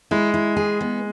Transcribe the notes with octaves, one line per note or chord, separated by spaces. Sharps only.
G#3 E4
E4
G#4
B3